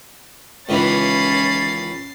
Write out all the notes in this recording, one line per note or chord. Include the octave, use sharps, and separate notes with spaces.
C#2 D#3 E3 C#4 B5 A6 C7